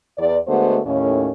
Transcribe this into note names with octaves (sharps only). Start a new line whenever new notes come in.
E2 D5
D3 G#3 A3 B3 F#4 C5
D#2 A2 C#4